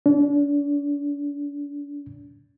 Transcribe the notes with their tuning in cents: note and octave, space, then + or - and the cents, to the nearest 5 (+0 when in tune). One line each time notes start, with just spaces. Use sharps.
D4 -40